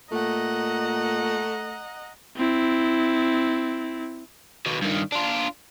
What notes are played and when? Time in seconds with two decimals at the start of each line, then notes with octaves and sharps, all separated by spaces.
0.12 A#2 A3 D#5 F#5 A#5
2.37 C4 E4
4.66 D#2 B2
4.82 G2 D#3
5.12 D4 F4